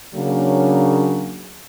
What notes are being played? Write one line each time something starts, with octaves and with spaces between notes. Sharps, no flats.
C#3 F#3 A#3 D4